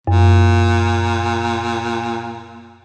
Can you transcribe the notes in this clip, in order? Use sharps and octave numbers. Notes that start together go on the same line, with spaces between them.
F#2 A#2